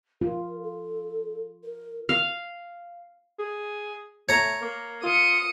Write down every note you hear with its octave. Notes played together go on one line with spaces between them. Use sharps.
F4 A#4
A4
A#4
F5
G#4
A3 C#5 A#5
A#3
F4 D#6 C#7